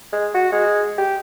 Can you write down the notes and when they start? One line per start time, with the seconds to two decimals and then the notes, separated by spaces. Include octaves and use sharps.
0.13 G#3
0.34 F#4
0.52 G#3
0.98 G4